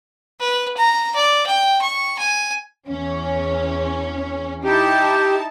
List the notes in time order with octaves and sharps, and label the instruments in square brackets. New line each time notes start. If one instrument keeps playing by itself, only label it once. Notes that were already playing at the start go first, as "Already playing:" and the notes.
[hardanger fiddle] B4
A#5
D5
G5
C#6
G#5
[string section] E2 C#4
[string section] D#4 E4 A5 [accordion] G4